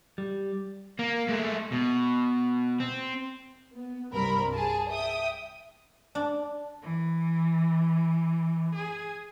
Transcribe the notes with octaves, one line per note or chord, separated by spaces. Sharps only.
G3
A#3
G#3 A3
B2
C4
B3
C2 G2 G3 C4 A#4 B5
G#4 A5
E5 G5 D#6
D4
E3
G#4